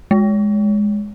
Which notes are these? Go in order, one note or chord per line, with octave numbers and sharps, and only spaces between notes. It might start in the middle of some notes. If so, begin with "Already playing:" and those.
G#3